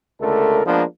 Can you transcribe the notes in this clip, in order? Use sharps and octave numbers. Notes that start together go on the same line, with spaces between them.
C#2 D3 A3 A4 A#4
F3 G#3 A#3 B3 D4